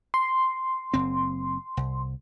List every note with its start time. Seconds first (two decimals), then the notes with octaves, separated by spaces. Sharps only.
0.14 C6
0.94 F#1 C4
1.77 C2